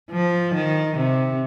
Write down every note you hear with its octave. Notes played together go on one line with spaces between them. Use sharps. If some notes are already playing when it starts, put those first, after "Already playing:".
F3
D#3
C3